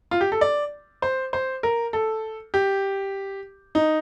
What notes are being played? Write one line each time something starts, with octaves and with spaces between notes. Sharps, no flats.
F4
G4
A4
D5
C5
C5
A#4
A4
G4
D#4